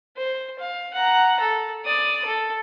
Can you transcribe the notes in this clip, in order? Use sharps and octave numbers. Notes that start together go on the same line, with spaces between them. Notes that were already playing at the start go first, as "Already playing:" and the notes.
C5
F5
F#5 A#5
A4
D5 D#6
A4